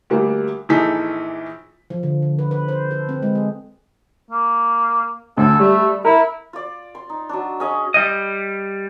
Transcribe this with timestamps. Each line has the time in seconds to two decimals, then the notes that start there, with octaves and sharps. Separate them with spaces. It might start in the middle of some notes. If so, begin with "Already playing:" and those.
0.10 D2 G3 A#3
0.69 A#1 E3 D#4 G#4 A4 B6
1.90 F3
2.03 D3
2.22 D3
2.39 B4
2.51 B4
2.68 C5
2.91 A4
3.09 C4
3.22 G#3
3.35 G#4
4.31 A#3
5.37 D2 A4
5.60 G3 A3
6.05 E4 A#4
6.53 F4 D5
6.95 C6
7.09 D#4
7.29 F#3 D4
7.60 C#4 G#4 D#5 F5
7.94 G3 D#5